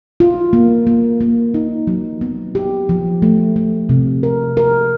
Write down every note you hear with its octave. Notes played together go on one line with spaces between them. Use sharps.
F4
A#3
A#3
A#3
D#4
F#3
B3
G4
F3
A3
A3
C3
A#4
A#4